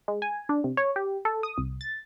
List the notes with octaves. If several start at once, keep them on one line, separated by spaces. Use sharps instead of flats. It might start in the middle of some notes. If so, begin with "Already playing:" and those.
G#3
G#5
D4
C3
C#5
G4
A4
D#6
C2
A6